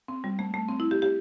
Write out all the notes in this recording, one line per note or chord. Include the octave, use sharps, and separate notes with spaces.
C4
G3
A3
A3
C4
E4
G4
G4